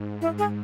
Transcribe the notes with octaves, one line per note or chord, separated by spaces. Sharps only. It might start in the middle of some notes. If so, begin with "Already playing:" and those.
Already playing: G#2
G#2 E4
G#4